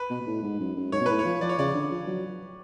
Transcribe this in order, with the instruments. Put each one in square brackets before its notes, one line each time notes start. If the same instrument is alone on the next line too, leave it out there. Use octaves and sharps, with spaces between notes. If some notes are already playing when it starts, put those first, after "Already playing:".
Already playing: [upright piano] B4
[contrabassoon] B2
B2
A2
G#2
F#2
F#2
[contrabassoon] G#2 [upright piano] C#5
[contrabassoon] B2
[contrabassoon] A2 [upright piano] B4
[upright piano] C#5
[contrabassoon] F3
[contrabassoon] F3 [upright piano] D5
[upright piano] C#5
[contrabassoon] C#3 [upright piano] D5
[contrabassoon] D3
F3
F#3